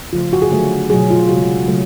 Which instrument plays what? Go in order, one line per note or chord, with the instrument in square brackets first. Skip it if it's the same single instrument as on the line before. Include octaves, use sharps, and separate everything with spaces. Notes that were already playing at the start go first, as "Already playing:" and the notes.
[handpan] C#3 F3 A3 F4
F#4
G#4
D3 F#3 A3 F#4
B2 F#3 A3 G#4
F4
C#3 G#3 F#4
C#3 F#3 A3